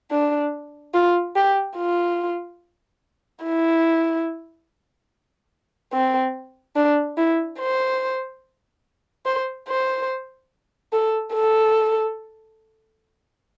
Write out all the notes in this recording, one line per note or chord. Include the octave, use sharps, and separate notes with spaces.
D4
F4
G4
F4
E4
C4
D4
E4
C5
C5
C5
A4
A4